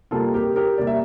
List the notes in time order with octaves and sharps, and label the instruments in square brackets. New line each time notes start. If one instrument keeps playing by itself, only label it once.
[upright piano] C3 G3 A#3 F4 A4
G4 A#4
G4 A#4
C3 G3 A#3 D5
E5